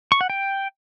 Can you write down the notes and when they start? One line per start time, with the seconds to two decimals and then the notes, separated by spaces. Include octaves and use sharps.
0.12 C#6
0.21 F#5
0.30 G5